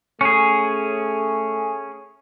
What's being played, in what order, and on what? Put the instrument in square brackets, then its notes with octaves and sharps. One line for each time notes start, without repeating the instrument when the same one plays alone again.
[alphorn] A3 [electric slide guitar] C#4 G#4